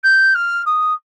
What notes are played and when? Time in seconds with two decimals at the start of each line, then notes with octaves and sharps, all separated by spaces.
0.04 G6
0.35 F6
0.66 D#6